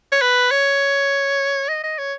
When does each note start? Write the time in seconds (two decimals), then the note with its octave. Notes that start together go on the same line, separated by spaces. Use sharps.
0.12 C#5
0.22 B4
0.51 C#5
1.68 D#5
1.83 D#5
1.98 C#5